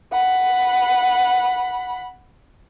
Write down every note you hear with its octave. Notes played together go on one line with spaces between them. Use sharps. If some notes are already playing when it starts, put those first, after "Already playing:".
F#5 B5